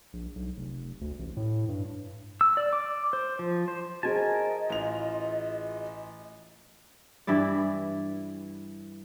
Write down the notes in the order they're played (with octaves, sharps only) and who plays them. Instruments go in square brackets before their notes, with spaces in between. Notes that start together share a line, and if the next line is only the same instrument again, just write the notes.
[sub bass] A#1
B1
F1
D2
A1
A2
G2
[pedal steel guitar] E6
D5
D6
C5
F3
C5
[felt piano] F#4 G#4 C5 [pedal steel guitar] A#4 G#5 A5 [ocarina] D#5
[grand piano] A1 F7 [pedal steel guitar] F4
[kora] G2 E3 E4 D5